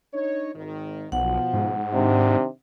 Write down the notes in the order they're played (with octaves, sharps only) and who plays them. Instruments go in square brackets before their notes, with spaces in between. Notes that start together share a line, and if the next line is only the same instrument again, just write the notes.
[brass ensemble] D4 D#4 C#5
G#1 D#3
[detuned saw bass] B1 [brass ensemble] B2 F3 [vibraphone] F#5
[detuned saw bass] G#2
[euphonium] C3 [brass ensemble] D#3 D4 D#4